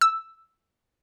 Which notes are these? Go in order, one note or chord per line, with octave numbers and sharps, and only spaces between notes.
E6